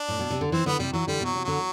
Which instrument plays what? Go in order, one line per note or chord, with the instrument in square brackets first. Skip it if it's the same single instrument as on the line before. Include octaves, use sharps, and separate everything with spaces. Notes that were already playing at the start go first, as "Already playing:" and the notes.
Already playing: [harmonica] D4
[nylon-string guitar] A2
B2
C3
D3
[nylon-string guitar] E3 [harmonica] C4
[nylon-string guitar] D3 [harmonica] B3
[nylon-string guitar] C3 [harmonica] G3
[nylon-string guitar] E3 [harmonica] F#3
[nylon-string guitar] D3 [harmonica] G3
[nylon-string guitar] B2 [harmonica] F#3
[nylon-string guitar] C3
[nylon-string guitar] D3 [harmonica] F#3